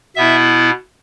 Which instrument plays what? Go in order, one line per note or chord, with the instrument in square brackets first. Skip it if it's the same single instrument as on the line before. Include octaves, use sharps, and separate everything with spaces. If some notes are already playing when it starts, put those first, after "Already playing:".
[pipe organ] B2 B3 E4 E5